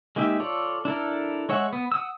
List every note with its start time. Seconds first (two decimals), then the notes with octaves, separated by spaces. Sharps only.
0.16 G#3 A#3 D#4 G4 E5
0.40 F4 A4 C#5 D5
0.85 D4 E4 A4 A#4
1.49 G#3 C#5 E5 F#5
1.73 B3
1.92 F#5 D#6 E6